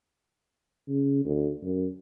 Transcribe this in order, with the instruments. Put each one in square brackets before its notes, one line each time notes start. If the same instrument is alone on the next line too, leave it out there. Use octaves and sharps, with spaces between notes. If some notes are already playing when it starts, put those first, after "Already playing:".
[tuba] C#3
D2
F#2